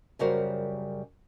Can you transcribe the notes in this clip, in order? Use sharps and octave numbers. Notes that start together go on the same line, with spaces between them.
F#2 C#3 G3 F#4 A#4 C5